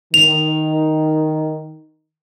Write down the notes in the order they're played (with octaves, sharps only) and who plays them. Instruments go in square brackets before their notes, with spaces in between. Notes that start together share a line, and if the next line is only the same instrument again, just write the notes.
[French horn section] D#3 [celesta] F7